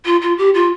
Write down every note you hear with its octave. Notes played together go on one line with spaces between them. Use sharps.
F4
F4
G4
F4